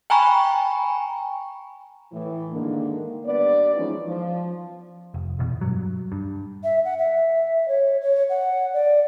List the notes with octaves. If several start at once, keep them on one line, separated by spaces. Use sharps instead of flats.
G5 G#5 A#5 B5 C#6
A2 E3
G#2 D3 D#3 A#3
G2 B3 D5
E3 F3 G#3 C#4 D#4
F3
F1
E1 E2 B2
G2 F#3
G2
E5
F#5
E5
C#5
C#5
F#5
D5